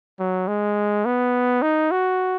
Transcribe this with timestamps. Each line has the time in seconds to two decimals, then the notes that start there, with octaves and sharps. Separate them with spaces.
0.20 F#3
0.48 G#3
1.05 B3
1.62 D#4
1.91 F#4